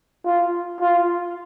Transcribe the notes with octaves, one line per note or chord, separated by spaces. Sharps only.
F4
F4